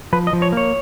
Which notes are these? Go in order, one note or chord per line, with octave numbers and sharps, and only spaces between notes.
F3 B4
D#5
F3
C#5
A#3 C#5